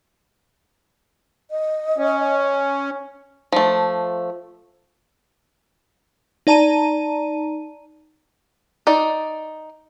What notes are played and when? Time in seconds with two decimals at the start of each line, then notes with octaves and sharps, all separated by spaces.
1.51 D#5
1.98 C#4
3.52 F3 A3
6.47 D#4 D5 A5 A#5 D#7
8.87 D#4 D5